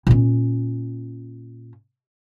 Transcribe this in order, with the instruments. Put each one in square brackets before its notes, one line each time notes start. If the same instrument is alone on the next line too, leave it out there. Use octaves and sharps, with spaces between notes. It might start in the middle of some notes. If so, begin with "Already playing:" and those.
[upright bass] A#2 C#4